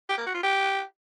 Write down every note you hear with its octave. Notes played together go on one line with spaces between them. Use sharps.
G4
A#3
F#4
F4
G4